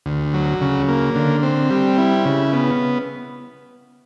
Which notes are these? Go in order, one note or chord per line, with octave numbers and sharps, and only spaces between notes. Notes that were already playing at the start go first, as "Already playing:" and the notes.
D2
F#3
C#3
A#3
D3
C4
G3
E4
C#3
B3